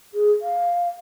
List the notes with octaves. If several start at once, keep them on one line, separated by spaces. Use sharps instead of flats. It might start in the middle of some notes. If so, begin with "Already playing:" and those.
G#4
F5